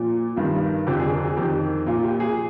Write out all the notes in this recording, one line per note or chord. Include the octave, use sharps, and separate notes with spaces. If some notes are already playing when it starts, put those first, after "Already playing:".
Already playing: A#2 F3
G2 D#3 F4
F2 D3 F3 G4
G#4
A#4
G#4
F2 D#3 G4
A#2 F3 F4
G4
G#4